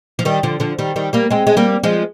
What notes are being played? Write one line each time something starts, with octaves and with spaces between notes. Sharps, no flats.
F3
D#3 G3
D3 F3
D3 F3
D#3 G3
D#3 G3
G3 A#3
G#3 C4
G#3
G3 A#3
F3 G#3